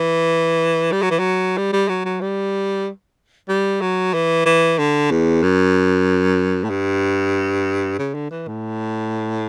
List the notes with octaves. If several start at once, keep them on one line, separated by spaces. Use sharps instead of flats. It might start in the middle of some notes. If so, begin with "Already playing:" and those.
Already playing: E3
G3
F#3
E3
F#3
G3
G3
F#3
F#3
G3
G3
F#3
E3
E3
D3
E2
F#2
A2
G2
C#3
D3
E3
A2